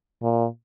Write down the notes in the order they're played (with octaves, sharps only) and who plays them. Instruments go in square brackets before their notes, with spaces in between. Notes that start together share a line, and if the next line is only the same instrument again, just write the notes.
[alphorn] A#2